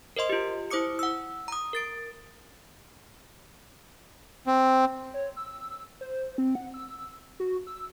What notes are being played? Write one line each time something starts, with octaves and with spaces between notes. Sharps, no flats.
A#4 C5 D#5 C6
F4 G4
E4 C5 D6 D#6 C#7
F#5 E6
A#5 D#6
A#4 A6 D7
C4
C#5
E6
C5
C4
F#5
E6
F#4
E6